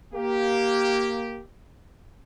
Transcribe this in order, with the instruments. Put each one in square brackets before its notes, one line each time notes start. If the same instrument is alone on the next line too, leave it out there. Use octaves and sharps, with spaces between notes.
[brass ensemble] A#3 G4